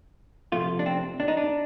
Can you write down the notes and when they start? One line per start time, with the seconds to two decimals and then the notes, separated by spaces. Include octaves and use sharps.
0.52 C3 F3 A3 F4
0.79 D4
0.86 C4
1.20 D4
1.28 D#4
1.37 D4